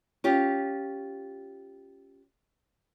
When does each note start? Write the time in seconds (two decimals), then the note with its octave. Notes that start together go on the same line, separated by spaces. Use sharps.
0.24 C#4 F4 G4